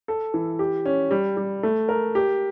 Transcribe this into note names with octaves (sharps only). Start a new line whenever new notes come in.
A4
E3
G4
C#4
G3
G3
A3
A#4
G4